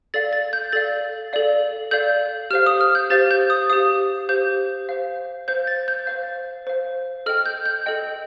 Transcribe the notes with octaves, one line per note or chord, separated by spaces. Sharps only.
A4 D5 F5 A6
A6
G6
A4 D5 F5 A6
A4 D5 F5
A4 D5 F5 G6
G4 C5 F5 F6
D#6
F6
G6
G4 C5 F5 A6
G6
D#6
G4 C5 F5 D#6
G4 C5 F5 G6
C5 F5
C5 F5 G6
A6
G6
C5 F5
C5 F5
A4 D#5 G5 F6
G6
G6
A4 D#5 G5